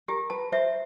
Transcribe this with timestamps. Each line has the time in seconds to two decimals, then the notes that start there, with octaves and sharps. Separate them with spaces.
0.08 G4 A#4
0.30 B4 A5
0.52 C5 E5